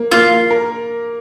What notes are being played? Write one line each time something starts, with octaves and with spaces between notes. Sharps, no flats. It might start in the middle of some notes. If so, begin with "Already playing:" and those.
Already playing: A#3
A#3 F4
A#4